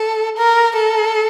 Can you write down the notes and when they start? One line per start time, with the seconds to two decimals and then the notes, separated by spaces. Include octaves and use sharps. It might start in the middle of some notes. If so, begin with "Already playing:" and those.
Already playing: A4
0.37 A#4
0.76 A4